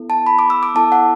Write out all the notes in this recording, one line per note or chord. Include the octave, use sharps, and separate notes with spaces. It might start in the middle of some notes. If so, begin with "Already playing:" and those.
Already playing: B3 E4 A4
A5
B5
D6
E6
D6
B3 E4 A4 A5
F#5